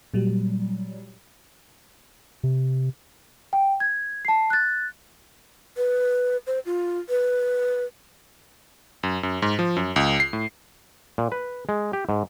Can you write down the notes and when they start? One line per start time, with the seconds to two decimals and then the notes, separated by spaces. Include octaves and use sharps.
0.14 A#2 F#3 G3
2.44 C3
3.53 G5
3.80 G#6
4.25 A5 C7
4.50 F#6 A6
5.77 B4
6.47 C5
6.66 F4
7.09 B4
9.03 F#2
9.23 F#2
9.42 G#2
9.59 F3
9.77 F#2
9.96 C#2
10.20 C7
10.33 A2
11.18 A#2
11.32 B4
11.69 G#3
11.93 G4
12.09 G#2